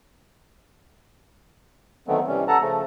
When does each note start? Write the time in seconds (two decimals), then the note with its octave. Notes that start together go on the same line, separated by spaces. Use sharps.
2.08 D3 D#3 F#3 A3 B3 C4
2.27 C3 E3 G3 C#4
2.48 A4 F#5 A5 A#5
2.61 C#3 F3 A3